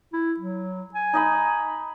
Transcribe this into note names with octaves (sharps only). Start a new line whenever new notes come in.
E4
F#3
G#5
D#4 D#5 B5